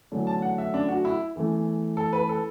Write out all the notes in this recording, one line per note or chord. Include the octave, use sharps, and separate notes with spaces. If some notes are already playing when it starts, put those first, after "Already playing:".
E2 D3 F#3 A3 D4
A5
F#5
E5
D4
F#4
E4
E2 E3 A3
A4
B4
A4